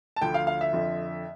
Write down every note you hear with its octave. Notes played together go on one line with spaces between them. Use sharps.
A5
D2 D3 F3 G5
F5
F5
E5
F2 D3 F3